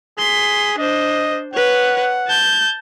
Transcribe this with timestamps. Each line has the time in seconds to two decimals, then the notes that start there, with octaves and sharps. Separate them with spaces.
0.18 G#4 C6 B6
0.79 D4 C5 D#5
1.54 B4 C#5 F#5
2.28 A5 G6